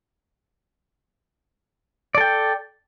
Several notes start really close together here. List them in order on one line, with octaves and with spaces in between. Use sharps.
D5 A4 G5